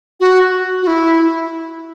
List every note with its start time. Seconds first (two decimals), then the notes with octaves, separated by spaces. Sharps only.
0.20 F#4
0.82 F#4
0.87 E4